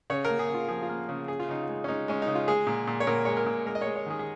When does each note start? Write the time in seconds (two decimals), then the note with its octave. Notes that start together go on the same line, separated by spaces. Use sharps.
0.10 C#3 C#5
0.25 A#3 A#4
0.39 G#4
0.49 C#3
0.54 F4
0.68 F3 G#4
0.82 F4
0.89 A#3
1.09 C#3
1.28 C#3 G#4
1.40 F4
1.49 C#3 D#4
1.63 F4
1.69 G#3
1.84 C#4
1.88 G#3 D#4
2.08 G#3 C#4
2.22 D#4
2.28 C#3
2.35 F4
2.48 G#3 G#4
2.67 A#2
2.87 A#2
3.00 C#5
3.07 A#2 A#4
3.25 G#3 C#5
3.37 A#4
3.46 A#2
3.66 G#3 A#4
3.75 D#5
3.81 C#5
3.87 G#3
3.95 C#5
4.06 D#3 G#4
4.19 G#4